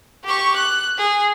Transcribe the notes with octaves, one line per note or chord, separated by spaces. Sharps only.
G4 C#6
F#6
G#4